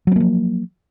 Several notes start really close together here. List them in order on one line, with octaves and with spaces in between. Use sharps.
F#3 C4 A#3 F3